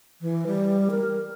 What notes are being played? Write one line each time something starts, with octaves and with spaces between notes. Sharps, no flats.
E3
G3
A#4